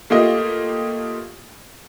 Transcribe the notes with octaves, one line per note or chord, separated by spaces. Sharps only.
A3 A#3 F4 G4 D#5